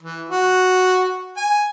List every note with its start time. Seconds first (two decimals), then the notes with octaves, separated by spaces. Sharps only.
0.03 E3
0.29 F#4
1.37 G#5